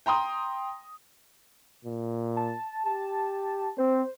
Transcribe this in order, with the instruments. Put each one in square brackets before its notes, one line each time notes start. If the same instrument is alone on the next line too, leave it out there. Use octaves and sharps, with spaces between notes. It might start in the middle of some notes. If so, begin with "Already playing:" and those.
[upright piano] G5 A#5 C6 D#6
[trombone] A#2
[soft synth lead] A5
[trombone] G4 [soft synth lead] A5
[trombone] C4 [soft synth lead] C5